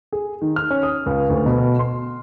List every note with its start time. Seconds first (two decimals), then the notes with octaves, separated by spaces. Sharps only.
0.12 G#4
0.41 D#3
0.56 F6
0.70 C#4
0.83 D#6
1.06 C#2
1.29 D2
1.46 B2
1.79 C6